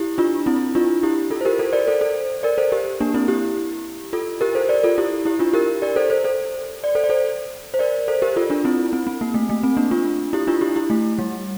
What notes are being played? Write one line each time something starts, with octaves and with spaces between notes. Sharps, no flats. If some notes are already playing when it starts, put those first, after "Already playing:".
Already playing: E4 G4
D4 F4
C4 E4
D4 F4
E4 G4
F4 A4
C5
G4 A#4
A4 C5
A#4 D5
A4 C5
A4 C5
A#4 D5
A4 C5
G4 A#4
A#3 D4
C4 E4
E4 G4
F4 A4
G4 A#4
A4 C5
A#4 D5
F4 A4
E4 G4
E4 G4
D4 F4
G4 A#4
A#4 D5
A4 C5
A4 C5
A4 C5
D5
A4 C5
D5
A4 C5
C5
A#4 D5
A4 C5
G4 A#4
F4 A4
D4 F4
C4 E4
C4
C4
A#3
A3
A3
C4
A#3 D4
D4 F4
E4 G4
D4 F4
E4 G4
E4 G4
A3
G3